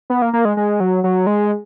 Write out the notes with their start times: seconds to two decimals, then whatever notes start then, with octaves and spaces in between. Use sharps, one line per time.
0.10 B3
0.22 A#3
0.33 A#3
0.45 G#3
0.57 G#3
0.80 F#3
1.04 F#3
1.27 G#3